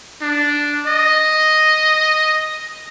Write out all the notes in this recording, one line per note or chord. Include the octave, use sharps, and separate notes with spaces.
D4
D#5